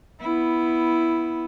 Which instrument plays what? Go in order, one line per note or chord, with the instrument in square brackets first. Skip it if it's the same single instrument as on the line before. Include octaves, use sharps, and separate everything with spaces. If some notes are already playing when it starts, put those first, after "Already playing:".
[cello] B3 E4